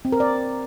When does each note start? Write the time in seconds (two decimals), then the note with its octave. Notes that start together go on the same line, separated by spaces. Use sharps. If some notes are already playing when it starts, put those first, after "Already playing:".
0.05 C4
0.12 A#4
0.20 D5